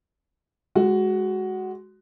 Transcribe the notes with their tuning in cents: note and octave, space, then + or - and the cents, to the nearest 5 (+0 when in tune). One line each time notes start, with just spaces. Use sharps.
G#3 +0 F#4 +10